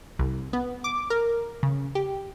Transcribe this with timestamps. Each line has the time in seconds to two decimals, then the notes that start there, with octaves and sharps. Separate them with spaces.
0.19 C2
0.53 B3
0.84 D6
1.10 A#4
1.63 C#3
1.95 G4